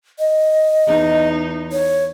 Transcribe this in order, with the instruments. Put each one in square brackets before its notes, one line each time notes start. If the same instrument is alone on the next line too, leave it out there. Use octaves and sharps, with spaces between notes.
[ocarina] D#5
[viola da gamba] E2 D#4
[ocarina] C#5